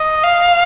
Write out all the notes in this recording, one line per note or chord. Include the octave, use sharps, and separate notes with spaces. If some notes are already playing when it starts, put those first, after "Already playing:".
Already playing: D#5
F5